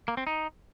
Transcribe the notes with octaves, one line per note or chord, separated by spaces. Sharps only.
A#3
C4
D#4